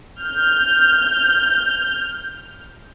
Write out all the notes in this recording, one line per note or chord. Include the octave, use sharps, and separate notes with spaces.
F6 G6